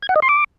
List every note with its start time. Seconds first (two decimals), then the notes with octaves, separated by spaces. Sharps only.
0.02 G#6
0.09 F#5
0.16 D#5
0.22 C6
0.29 D6